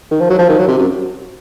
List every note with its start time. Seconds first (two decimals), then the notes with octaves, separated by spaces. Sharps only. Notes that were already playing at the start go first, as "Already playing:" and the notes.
0.11 D#3
0.20 F3
0.30 F#3
0.39 F3
0.49 D#3
0.59 F#3
0.68 C3
0.79 F#2